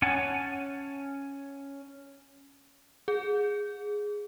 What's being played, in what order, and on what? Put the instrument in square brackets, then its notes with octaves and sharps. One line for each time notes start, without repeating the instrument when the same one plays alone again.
[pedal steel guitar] C#4 C#5 F#5 G#5 A5
[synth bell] G#4